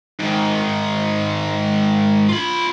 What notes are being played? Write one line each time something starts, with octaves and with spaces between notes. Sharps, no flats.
G#2 D#3
F4 B5